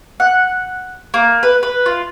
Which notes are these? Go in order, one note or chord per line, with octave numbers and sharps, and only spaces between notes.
F#5
A#3
B4
B4
F4